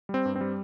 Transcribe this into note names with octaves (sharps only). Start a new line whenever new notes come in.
G3 C4
G2
C4
G3